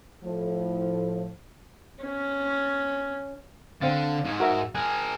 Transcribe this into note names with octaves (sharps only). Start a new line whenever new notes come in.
A2 F3
C#4
D3 C4 F5 A6
G#2 G#4
F#4 A#4 E5
G#4 A#4 G#5 F#6